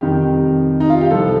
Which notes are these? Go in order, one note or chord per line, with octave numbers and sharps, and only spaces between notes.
F2 C3 D#3 G3 G4
D#4
F4
G4
C2 C3 F3 A4